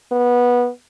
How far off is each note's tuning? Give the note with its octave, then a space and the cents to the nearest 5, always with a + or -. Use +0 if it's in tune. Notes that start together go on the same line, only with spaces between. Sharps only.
B3 -15